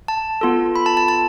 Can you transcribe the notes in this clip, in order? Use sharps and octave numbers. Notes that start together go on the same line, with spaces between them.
A5
B3 F4 A4
B5
A5
A5
A5